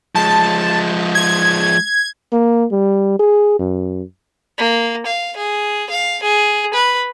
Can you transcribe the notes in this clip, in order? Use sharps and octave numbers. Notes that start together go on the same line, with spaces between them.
F3 G#3 A5
G#6
A#3
G3
G#4
F#2
A#3
F5
G#4
F5
G#4
B4